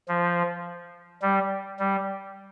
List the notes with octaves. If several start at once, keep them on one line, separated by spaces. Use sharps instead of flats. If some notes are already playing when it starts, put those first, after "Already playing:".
F3
G3
G3